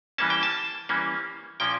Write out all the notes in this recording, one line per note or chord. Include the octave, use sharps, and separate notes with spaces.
E3 G3 A#3 C#4 A5
G5
A5
E3 G3 A#3 C#4
A#2 F3 A#3 C#4 G5